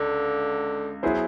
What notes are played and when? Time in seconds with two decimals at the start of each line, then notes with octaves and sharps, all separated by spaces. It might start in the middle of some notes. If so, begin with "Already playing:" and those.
Already playing: C#2 D3
1.03 F#3 B3 E4 G#4 C5